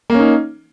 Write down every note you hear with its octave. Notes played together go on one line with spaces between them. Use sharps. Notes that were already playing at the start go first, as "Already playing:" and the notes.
A#3 C#4 D#4